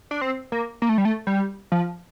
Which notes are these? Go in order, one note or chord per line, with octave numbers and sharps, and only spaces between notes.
D4
C4
A#3
A#3
A3
G3
A3
G3
F3